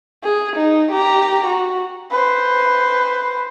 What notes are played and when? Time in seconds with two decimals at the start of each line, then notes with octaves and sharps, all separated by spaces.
0.24 G#4
0.57 D#4
0.92 G4 A#5
1.47 F#4
2.11 B4 C5